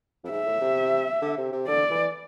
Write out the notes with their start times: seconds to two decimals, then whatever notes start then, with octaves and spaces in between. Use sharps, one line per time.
0.24 F2
0.30 G#2 E5
0.46 A2
0.61 C3
1.22 D3
1.37 C3
1.52 C3
1.68 D3 D5
1.90 E3